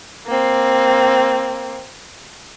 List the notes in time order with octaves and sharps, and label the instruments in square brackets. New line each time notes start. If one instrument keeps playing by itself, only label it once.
[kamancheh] A#3 C4